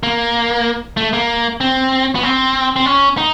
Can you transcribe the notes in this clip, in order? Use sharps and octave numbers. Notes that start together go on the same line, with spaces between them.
A#3
A3
A#3
C4
B3
C4
C4
C#4
D#4